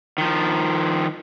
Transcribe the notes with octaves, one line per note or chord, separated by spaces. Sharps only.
D#3 F3